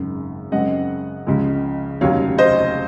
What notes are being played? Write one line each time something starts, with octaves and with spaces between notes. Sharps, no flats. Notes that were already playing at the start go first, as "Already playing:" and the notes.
Already playing: G#1 F#2 C#3
F#2 C#3 G#3 C4 D#5 F#5
C#2 C#3 F3 G#3
F1 D#2 C#3 F#3 C#5 F5
C5 D#5